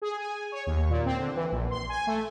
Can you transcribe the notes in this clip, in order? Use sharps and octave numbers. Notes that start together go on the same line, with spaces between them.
G#4
G#5
C#5
D#2
A#2
C4
D3
E3
A#1
C6
G#5
A3